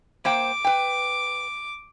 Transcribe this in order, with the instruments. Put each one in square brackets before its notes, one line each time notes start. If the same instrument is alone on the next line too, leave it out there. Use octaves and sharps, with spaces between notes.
[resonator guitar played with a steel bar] A#3 C5 G5 [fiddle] D6
[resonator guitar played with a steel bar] B4 G5